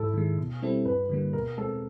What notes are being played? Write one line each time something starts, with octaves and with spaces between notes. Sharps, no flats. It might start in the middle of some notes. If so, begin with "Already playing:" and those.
Already playing: G#2 E4 A4
D#3 G#3
B2
G3 C4 E4 A4
G2 B4
D3 G3 A#3
B2 A#4
G#3 C4 A4